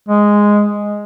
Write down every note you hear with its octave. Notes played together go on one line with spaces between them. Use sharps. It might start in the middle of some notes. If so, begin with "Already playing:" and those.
G#3